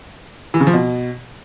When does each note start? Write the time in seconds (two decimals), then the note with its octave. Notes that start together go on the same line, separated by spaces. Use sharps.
0.54 E3
0.60 C#3
0.67 F3
0.73 B2